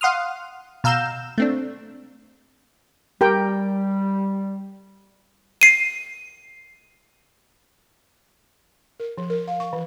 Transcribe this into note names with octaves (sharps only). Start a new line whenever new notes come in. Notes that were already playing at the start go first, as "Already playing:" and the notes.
F5 F#5 C6 D#6 F6
B2 F5 A#5 E6 G6 E7
A3 C4 D4
G3 G4 A#4 G5
C7 D#7
A#4
F3
A#4
F5
C#6
E3